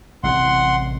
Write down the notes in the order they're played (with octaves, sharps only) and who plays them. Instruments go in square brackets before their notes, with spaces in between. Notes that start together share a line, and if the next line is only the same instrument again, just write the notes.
[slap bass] A1 C3 E3 [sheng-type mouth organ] F#5 C6